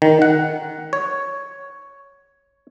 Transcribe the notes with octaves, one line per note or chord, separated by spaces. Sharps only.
D#3
F#5
C#5